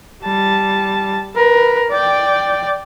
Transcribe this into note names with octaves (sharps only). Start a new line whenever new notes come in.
G3 A5
A#4 B4
D5 G5